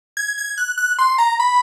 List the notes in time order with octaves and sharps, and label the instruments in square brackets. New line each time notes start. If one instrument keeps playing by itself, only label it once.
[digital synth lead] G#6
G#6
F#6
F#6
C6
A#5
B5